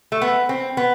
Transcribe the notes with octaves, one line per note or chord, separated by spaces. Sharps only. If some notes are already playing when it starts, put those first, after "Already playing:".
A3
B3
C4
B3